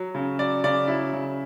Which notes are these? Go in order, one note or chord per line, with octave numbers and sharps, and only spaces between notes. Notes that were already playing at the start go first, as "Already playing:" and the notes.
Already playing: F#3
C#3
F#3 D5
C#3 D5
F#3 E4
C#3